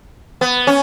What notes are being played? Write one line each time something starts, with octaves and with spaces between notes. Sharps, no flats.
B3
C#4